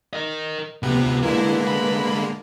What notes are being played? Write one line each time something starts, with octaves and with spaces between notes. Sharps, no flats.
A#4 D#5
D2 C3 F3 B3
D3 G#3 A#3 E4 B4
B5